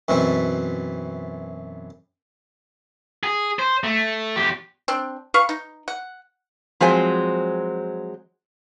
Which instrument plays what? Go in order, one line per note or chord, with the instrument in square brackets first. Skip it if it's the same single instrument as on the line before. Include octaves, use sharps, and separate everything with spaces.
[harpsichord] F#2 B2 E3 C4 E5
[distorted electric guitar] G#4
C5
A3
E2 G4
[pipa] C4 D4
B4 F5 C#6
D#4
F#5
[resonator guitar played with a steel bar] F3 F#3 G#3 C4 C5 G#5